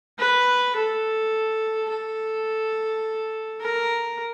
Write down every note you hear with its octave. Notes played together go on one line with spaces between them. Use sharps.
B4
A4
A4
A#4